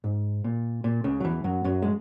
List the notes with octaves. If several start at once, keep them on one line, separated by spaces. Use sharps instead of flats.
G#2
A#2
A#2
C#2 C#3
F#3
E2 E3
F#2 F#3
F#2 F#3
G#3